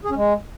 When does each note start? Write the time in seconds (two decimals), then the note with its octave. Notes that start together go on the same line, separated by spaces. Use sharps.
0.04 G#4
0.10 C#4
0.16 G#3